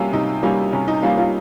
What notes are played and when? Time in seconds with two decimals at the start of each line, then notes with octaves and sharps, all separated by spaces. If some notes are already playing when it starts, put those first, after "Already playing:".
Already playing: C3 G3 A#3 C#4 F4
0.13 C3 D#4
0.43 G3 A#3 C#4
0.73 C3 C#4
0.88 D#4
1.02 G3 A#3 C#4 F4
1.17 C#4 F4